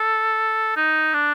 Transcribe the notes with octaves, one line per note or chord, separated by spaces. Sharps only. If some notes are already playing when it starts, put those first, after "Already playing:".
Already playing: A4
D#4
D4